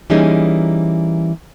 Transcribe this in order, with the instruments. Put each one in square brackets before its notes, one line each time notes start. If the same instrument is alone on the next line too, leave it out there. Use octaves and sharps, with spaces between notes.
[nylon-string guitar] E3 G3 A#3 C#4 D#4 G#4